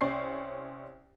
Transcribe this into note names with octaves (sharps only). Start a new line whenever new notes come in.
C2 C#4 C5 D5 C#6 C7